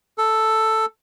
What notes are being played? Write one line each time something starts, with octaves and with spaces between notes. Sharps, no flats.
A4